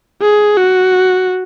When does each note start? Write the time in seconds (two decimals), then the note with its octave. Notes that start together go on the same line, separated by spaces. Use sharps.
0.22 G#4
0.57 F#4